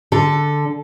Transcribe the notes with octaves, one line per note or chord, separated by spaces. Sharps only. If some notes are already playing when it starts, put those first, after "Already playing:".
D3 A4